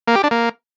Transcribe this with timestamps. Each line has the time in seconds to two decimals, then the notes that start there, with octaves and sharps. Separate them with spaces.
0.07 A#3
0.15 G4
0.23 D4
0.31 A#3